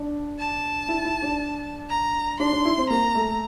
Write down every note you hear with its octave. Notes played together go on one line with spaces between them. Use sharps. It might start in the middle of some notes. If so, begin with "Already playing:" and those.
Already playing: D4
A5
E4
E4
D4
A#5
D4 C6
D4
E4
C4
A#3 A#5
A3